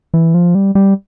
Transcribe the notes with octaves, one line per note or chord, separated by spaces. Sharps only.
E3
F3
G3
G3